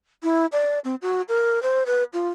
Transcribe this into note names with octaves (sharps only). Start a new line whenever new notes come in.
E4
D5
C4
F#4
A#4
C5
B4
F4